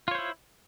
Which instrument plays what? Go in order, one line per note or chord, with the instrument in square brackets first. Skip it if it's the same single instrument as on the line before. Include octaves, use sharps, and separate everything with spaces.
[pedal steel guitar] F4
C#5
C5
E4